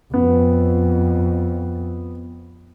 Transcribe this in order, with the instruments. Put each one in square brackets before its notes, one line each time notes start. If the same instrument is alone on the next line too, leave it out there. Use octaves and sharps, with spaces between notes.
[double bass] F2 [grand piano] B3